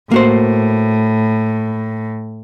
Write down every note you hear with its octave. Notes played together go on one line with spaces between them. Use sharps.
A2 A#3 F#4 C5